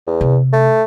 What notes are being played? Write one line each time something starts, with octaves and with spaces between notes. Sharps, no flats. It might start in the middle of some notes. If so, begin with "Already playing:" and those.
E2
C3
A3